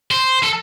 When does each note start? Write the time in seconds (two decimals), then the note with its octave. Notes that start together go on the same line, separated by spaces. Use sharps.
0.11 C5
0.43 A4